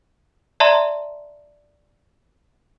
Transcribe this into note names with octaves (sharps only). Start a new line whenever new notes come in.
D5 E5 A5 A#5 C6